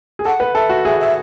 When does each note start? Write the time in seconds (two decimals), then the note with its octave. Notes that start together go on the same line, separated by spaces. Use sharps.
0.19 G#4
0.25 A4 F#5
0.40 B4
0.55 A4 E5
0.69 F#4
0.84 G#4 E5
1.00 E5